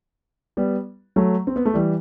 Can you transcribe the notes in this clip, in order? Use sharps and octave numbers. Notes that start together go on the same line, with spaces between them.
G3 B3
F#3 A3
C4
B3
A3
E3 G3